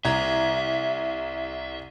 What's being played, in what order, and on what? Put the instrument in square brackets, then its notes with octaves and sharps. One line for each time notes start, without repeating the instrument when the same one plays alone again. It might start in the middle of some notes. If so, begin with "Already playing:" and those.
[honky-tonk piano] C2 A#5 G#6 [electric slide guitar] E5